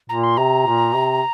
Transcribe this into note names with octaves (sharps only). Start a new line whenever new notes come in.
A#2 A#5
C6
C3 A#5
A#2
C3